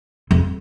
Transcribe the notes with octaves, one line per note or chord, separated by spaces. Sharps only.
F2